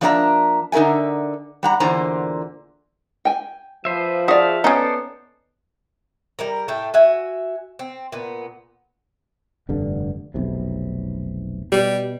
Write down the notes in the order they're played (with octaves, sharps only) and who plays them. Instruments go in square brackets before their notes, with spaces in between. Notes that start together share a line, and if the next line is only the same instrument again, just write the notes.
[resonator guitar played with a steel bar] F3 A#3 D4 E5 F5 A#5
D3 D#4 A#4 E5 G#5
G3 F#5 A#5
E2 A#2 D3 C5 A#5
[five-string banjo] G5 G#5
[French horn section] F3 [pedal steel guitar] B4 C5 E5
[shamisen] F#4 [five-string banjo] G#4 D5 [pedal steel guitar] E5 F5
[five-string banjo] B3 [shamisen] C#4 D#4 [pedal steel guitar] A4 C5 D5
[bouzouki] G3 A#4 A#5
A2 A3 A4 G5
F#4 E5 G#5
C4
A#2 B3
[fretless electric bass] F1 G2 D3
F1 B1 C3
[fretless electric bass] B2 [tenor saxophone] G3